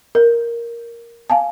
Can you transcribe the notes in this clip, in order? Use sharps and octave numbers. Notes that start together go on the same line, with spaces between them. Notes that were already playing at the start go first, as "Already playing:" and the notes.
A#4
F5 G#5 A5